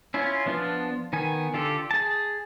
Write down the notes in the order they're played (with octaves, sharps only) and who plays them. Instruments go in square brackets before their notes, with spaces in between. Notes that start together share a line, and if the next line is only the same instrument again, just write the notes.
[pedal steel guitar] C#4 E4 F4
F3 B3 D4 F4
D#3 B3 G#5
D3 F4 G4 A4
G#4 A5